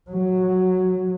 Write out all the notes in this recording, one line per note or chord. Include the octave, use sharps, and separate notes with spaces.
F#3